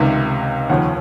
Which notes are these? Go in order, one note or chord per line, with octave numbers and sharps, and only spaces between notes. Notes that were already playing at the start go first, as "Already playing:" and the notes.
Already playing: C#2 C3 D#3
D#2 C#3 F3 F#5